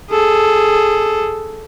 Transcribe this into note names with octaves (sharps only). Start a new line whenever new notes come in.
G#4 A4